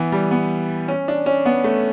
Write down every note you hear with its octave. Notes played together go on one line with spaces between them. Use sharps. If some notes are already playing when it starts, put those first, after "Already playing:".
Already playing: E3 B3
G3
B3
C#4
D4
C#4
B3
A3